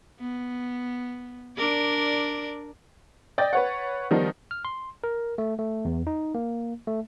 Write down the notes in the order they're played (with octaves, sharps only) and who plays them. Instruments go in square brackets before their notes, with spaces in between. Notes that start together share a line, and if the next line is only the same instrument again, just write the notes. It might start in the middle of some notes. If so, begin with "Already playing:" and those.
[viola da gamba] B3
D4 A#4 D5
[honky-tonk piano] D5 D#5 G5 A6
B4 C#5 F#5
D#3 F3 G3 B3 D#4
[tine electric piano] F6
C6
A#4
A3
A3
E2
D#4
A#3
A3